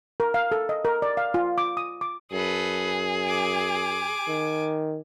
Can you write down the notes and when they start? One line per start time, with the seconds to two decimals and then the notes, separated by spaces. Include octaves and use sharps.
0.20 A#4
0.34 F5
0.52 A4
0.69 D#5
0.85 A#4
1.02 D5
1.17 F5
1.34 F4
1.58 D6
1.77 D#6
2.01 D6
2.33 F#2 G#4 A4 B4
3.24 G#5 D6
4.28 D#3